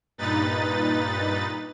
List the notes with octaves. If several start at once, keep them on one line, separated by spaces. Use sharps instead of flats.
G2 A#2 D#4 B4 A6